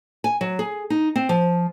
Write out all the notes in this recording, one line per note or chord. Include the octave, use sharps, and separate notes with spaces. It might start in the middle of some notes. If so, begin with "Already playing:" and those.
G#5
F#3
G#4
D#4
C4
F3